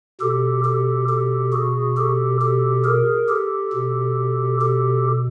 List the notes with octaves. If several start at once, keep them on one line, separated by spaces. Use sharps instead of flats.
B2 G4 A4
G4 A4
G4 A4
F#4 G#4
G4 A4
G4 A4
G#4 A#4
G4 A4
B2
G4 A4